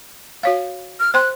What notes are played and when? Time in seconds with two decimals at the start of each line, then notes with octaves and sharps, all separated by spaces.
0.43 F#4 C#5 F5
1.00 F6
1.14 C5 G5 C6 F#6